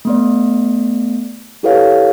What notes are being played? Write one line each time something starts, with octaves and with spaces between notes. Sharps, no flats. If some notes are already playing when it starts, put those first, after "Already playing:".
A3 B3 D5
E4 G4 A4 B4 C#5 F5